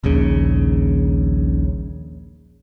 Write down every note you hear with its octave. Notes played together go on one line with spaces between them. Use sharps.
D#1 A#1 D#2 C#3